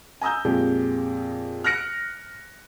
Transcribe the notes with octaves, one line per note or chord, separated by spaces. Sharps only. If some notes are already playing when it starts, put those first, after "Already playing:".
G#5 A#5 D#6 E6 G6
F2 A#2 G#3 G4
F6 F#6 A#6 C#7 D7